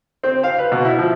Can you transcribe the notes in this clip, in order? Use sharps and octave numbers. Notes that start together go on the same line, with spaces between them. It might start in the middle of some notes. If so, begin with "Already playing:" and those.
C4
F5
B4
B2
E4
F3